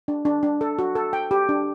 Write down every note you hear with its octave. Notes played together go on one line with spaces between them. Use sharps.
D4
D4
D4
A4
F#4
A4
G5
G4
D4